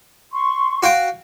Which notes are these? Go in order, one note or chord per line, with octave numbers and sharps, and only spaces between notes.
C6 C#6
F#4 F5 G5